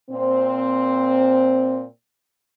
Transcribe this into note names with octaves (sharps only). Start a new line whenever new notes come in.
A#2 C4